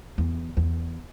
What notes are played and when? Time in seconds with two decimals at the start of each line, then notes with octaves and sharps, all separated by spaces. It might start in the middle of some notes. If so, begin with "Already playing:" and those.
0.18 E2
0.57 E2